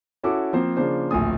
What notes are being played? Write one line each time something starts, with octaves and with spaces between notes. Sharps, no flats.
C#4 E4 F#4 A4 D6
F3 A#3 C4 C5
C#3 F3 A#3 D4 C5
D1 A#1 A2 G#5 D#6